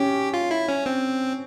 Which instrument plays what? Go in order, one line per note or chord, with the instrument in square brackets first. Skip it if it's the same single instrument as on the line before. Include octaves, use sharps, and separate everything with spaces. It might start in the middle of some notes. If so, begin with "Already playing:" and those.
Already playing: [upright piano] C#4 [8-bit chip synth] G4
[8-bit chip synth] F4
E4
C#4
C4